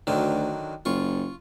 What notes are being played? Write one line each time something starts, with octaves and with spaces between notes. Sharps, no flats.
D2 D3 D#3 F#3
F#1 F4 C#6